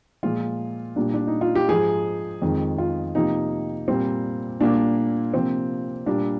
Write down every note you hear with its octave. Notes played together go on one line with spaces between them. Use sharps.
A#2 F3 G#3 F4
A#2 G3 A#3 D4
D4
D#4
F4
G4
G#2 F3 G#3 G#4
F2 D#3 G#3
F4
C3 F3 A#3 D#4
A#2 G3 A#3 C4
A#2 G3 A#3 D4
C3 F3 A#3 C4
A#2 G3 A#3 D4